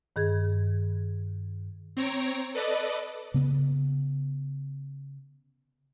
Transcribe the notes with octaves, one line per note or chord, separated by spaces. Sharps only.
G2 D#3 G#4 G#6
C4 C#5 A#5 D7
A4 B4 D5 D#5
C#3 B3